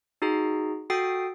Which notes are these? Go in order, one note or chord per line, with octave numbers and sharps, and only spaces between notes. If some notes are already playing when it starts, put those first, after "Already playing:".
D#4 F#4 G#4 A#5
F#4 A4 G5 D#6 A6 C7